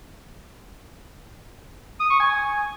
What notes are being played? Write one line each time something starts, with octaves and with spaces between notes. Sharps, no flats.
D#6
C#6
G#5